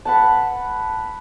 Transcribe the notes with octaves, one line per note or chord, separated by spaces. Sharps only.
B4 F#5 A5